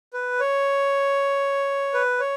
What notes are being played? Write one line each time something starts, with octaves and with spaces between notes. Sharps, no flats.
B4
C#5
B4
C#5